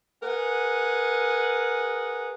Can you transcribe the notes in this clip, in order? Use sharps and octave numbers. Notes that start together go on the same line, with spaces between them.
G#4 A#4 B4 F#5